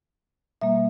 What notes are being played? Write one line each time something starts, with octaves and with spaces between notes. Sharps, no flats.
B2 G3 A#3 E5